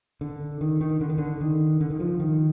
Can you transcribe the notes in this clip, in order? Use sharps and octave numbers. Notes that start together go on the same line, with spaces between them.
D3
D#3
D#3
D3
D#3
D3
D#3
D3
D#3
F3
D#3